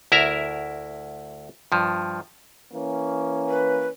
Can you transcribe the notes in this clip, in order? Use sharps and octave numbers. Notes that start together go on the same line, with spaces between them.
D2 E4 A#4 E5 A#5
G2 F3
E3 A#3 C#4
B4